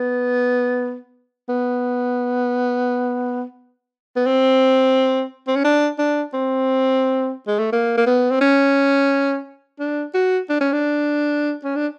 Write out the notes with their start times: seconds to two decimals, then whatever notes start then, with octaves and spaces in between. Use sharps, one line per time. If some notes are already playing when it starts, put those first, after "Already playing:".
Already playing: B3
1.49 B3
4.16 B3
4.26 C4
5.47 C4
5.56 C#4
5.64 D4
5.99 D4
6.33 C4
7.47 G#3
7.59 A3
7.72 A#3
7.98 A#3
8.07 B3
8.31 C4
8.41 C#4
9.80 D4
10.14 F#4
10.49 D4
10.61 C#4
10.73 D4
11.64 C#4
11.76 D4